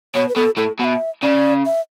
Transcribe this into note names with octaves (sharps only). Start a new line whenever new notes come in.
B2 C#5
B4
B2 A4
A2 A4
B2 E5 F#5
C#3 D5
E5